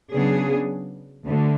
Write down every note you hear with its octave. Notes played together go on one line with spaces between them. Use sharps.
C#3 F#3 B3 D4 G#4
D2 D3 A3